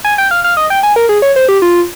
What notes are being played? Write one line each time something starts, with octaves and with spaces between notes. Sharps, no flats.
G#5
G5
F5
F5
D#5
G5
G#5
A#4
G#4
C#5
C5
G4
F4